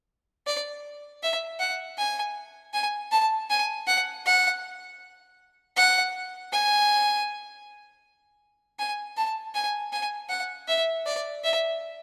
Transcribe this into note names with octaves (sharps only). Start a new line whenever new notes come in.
D5
E5
F#5
G#5
G#5
A5
G#5
F#5
F#5
F#5
G#5
G#5
A5
G#5
G#5
F#5
E5
D5
E5